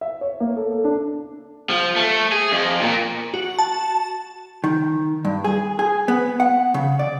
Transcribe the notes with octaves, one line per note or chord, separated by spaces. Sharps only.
E5
C#5
A#3
A4
A4
D4
F3
A3
G#4
F2
A#2
F#4
A5
D#3
G2
G#4
G#4
B3
F#5
C#3
D5